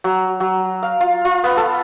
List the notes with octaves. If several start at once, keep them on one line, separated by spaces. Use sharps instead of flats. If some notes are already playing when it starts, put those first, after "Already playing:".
F#3
F#3
F5
F4
F4
B3
A4